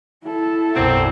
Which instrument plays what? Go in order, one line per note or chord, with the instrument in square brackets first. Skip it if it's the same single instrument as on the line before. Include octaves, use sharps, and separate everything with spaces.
[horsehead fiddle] E4 A4
[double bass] B1 F#2 [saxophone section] F#3 G3 C4